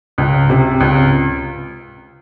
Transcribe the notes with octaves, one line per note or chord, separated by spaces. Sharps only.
C#2
C3
C#2